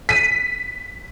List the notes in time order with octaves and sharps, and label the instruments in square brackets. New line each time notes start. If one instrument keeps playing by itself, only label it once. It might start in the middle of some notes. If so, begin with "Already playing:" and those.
[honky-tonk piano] B6 D#7